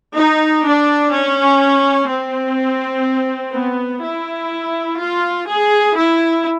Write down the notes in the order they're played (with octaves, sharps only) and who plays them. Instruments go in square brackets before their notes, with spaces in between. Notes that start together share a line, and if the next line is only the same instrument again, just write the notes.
[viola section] D#4
D4
C#4
C4
B3
E4
F4
G#4
E4